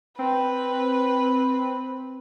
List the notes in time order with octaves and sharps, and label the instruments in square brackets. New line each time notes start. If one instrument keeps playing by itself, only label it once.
[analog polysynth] C4 [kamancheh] B4